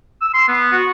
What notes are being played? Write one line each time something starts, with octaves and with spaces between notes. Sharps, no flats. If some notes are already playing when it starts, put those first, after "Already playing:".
E6
C6
B3
F#4